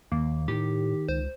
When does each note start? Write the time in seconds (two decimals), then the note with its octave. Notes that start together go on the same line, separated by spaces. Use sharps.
0.12 D#2 A#3
0.48 A2 D#3 G4
1.08 C#2 C5